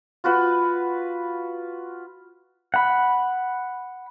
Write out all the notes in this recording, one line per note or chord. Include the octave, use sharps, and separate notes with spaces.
F4 F#4 B4
F#5 B5